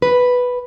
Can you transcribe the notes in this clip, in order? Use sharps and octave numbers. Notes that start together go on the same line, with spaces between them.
B4